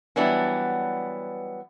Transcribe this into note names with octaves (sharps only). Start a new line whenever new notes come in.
E3 F#3 G3 B3 D4